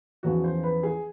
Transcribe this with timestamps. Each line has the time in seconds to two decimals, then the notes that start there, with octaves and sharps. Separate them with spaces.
0.23 E2 C#3 F3 F#4
0.44 C5
0.63 B4
0.83 G#4